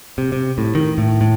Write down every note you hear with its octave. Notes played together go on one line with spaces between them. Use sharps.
C3
C3
A2
D#3
A2
A2